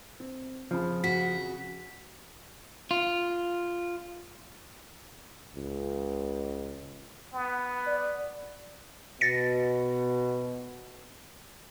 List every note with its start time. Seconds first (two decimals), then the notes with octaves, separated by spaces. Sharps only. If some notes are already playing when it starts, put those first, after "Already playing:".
0.20 C4
0.71 F2 C#3 F3 B5
1.04 F#4 B6
2.91 F4
5.55 C#2
7.34 B3
7.87 D5
9.21 B2 A6 A#6 C#7